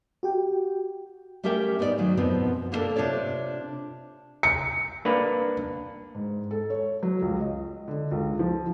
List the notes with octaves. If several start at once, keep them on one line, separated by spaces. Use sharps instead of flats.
F#4 G4 G5
A3 C#4 G4 A#4 E5 G5
G#2 B3 D#4 F4 D5
G#2 D#3 F#3
F#2 B2 F3 B3 C4
A#3 B3 D4 D#4 A4 A#4
C3 D4 F4 C#5 D5
C#7
A#3 D4 B4
G#2
A4
C#5
F#3
C#2
D#5
D3
C#2
F3